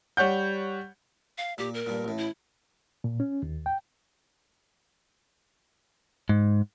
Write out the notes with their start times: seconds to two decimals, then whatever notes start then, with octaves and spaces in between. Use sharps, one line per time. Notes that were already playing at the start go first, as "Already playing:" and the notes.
0.17 G3 C#5 F#5 G6
1.38 F5
1.58 A#2 G4
1.74 A#4
1.86 G2 A#2
2.04 A1 A2
2.18 E4
3.04 A#2
3.20 C#4
3.43 D#2
3.66 G5
6.29 G#2